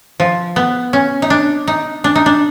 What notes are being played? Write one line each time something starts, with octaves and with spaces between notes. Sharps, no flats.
F3
B3
C#4
D#4
D4
D#4
D4
D#4
D4